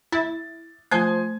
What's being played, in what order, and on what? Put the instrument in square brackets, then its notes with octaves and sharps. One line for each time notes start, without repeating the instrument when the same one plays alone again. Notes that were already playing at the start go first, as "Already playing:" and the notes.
[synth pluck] E4 [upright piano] A6
[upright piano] F3 G#5 G#6 [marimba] A3 D#6 [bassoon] C5 [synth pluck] G6